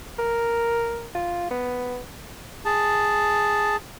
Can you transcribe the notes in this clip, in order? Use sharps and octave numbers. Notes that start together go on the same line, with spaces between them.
A#4
F4
B3
G#4 A5